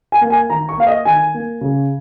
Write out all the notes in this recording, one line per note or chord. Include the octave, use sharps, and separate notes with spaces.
G#5
A#3
G#5
D#3 A#5
C#6
A#3 F5
D#5
D#3 G#5
A#3
C#3